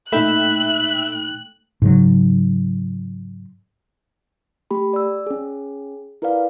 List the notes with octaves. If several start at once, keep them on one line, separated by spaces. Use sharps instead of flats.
A#2 A3 D#4 E5 G5 B5 F#6
G#2 C#3 F#3
A3 G4 B5
D5 E6
C#4 G#4
E4 A#4 B4 D5 F5